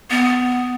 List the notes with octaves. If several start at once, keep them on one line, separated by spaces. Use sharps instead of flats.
B3